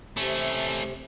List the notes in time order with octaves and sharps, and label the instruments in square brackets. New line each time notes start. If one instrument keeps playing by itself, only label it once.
[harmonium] C3 [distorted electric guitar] A3 C#4